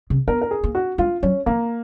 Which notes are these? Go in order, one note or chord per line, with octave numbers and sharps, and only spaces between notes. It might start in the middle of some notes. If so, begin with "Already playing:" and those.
C#3
B3 A#4
A#4
G#4
A#3
F#4
G#3 F4
F#3 C#4
F3 A#3